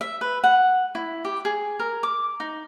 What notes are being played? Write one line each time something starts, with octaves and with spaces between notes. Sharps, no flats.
E5
B4
F#5
E4
G4
G#4
A#4
D6
D#4